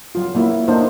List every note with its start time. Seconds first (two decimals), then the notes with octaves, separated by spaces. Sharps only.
0.15 F#3 F4
0.35 F#3 A#3 E4
0.68 A#3 D4 D#4 C5